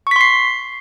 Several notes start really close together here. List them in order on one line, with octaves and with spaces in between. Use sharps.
C#6 B6 C6 C7